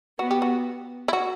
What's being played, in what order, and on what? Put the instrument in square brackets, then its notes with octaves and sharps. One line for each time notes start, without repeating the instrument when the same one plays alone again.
[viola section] B3 [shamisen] F#4
[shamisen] G4
F#4
E4
F#4